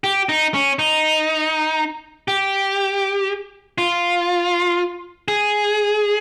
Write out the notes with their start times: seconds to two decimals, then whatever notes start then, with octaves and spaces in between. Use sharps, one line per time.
0.04 G4
0.29 D#4
0.54 C#4
0.79 D#4
2.28 G4
3.78 F4
5.28 G#4